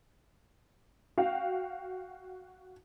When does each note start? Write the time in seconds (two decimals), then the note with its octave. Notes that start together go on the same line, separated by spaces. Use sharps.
1.18 F#4 F5 G5